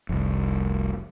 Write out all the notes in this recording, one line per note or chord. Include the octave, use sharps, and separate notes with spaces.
F1 C2 F2